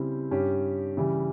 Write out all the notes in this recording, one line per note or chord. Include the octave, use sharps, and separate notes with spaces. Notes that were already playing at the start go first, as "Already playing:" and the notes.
Already playing: C#3 G3 C4 E4
G2 G3 C#4 G4
C#3 E3 G3